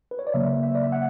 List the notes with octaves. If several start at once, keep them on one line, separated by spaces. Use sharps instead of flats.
B4
C#5
D5
C#3 F#3 A#3 E5
E5
D5
E5
F#5